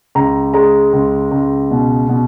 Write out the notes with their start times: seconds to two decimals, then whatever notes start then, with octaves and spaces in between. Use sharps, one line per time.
0.15 C#2 A#5
0.54 G#3 A#5
0.93 C#2
1.31 C#2
1.71 B2
2.09 B2